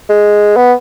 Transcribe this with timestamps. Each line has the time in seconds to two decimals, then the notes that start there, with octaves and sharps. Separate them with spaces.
0.09 G#3
0.57 B3